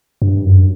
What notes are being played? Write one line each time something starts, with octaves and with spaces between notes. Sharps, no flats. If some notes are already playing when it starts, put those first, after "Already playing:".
G2
F#2